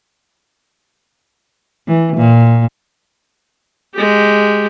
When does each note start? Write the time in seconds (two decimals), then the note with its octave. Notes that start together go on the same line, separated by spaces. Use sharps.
1.88 E3
2.16 A#2
3.95 G#3 G4